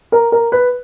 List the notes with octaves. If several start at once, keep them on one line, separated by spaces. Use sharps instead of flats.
A#4
A#4
B4